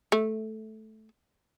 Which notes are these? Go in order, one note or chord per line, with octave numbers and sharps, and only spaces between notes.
A3